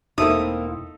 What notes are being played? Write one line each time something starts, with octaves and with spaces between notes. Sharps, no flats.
E1 A#3 C4 D#4 E4 A4 E5 D#6